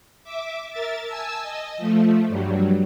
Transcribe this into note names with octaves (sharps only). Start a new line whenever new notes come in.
E5 D6
A#4 E5 A6
G#5 A5 E6
D#5
F3 A3
G2 F#3 G3